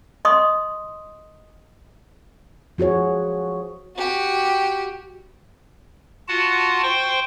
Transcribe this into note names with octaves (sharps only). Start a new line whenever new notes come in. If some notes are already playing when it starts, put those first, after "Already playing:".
D#5 C6 C#6 D#6
F3 F#4 G#4 C#5
F#4 G4
F4 F#4 F#5 A5
C5 G5 C6 C#6